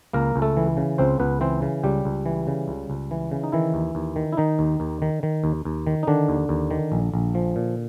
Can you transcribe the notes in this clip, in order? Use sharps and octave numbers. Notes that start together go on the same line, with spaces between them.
C#2 A#3 A#4
C#2
A3 A4
E3
C#3
C#2 C4 C5
C#2 B3 B4
E3 C4 C5
C#3
C#2 G3 G4
C#2
E3
C#3
C#2
C#2
E3
C#3
D#4
D#3 E3 E4
D#2
D#2
D#3
E4
D#3 D#4
D#2
D#2
D#3
D#3
D#2
D#2
D#3
D#4
D3 D#3 D4
D#2
D#2
D#3
A#1
A#1
F3
A#2